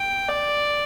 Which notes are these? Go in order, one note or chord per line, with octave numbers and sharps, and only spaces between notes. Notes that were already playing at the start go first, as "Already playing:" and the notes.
Already playing: G5
D5